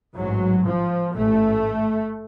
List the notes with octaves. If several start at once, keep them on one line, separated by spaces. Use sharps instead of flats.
A1 G#2 F#3
F3
A1 G#2 A3